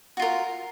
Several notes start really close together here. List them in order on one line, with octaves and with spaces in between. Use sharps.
F#4 F4 A#4